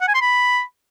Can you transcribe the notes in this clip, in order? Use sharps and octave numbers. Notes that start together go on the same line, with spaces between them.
F#5
G#5
C6
B5